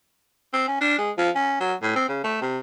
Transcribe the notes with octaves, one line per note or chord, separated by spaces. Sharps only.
C4
C#4
D4
G#3
F3
C#4
F#3
A2
C4
C#3
A3
C3